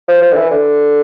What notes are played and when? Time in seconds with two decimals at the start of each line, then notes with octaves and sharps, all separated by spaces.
0.08 F3
0.22 F3
0.32 D3
0.36 E3
0.51 D3